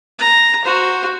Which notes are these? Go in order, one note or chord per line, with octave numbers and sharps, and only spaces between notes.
A#5
F#4 C5